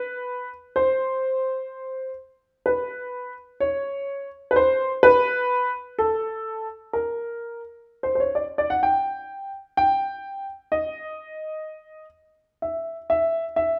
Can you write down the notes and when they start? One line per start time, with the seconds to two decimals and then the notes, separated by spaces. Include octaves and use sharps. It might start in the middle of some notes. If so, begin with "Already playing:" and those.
Already playing: B4
0.76 C5
2.66 B4
3.60 C#5
4.51 B4
4.56 C5
5.03 B4
5.99 A4
6.93 A#4
8.03 C5
8.15 C5
8.20 C#5
8.35 D5
8.58 D5
8.70 F#5
8.83 G5
9.77 G5
10.72 D#5
12.62 E5
13.10 E5
13.56 E5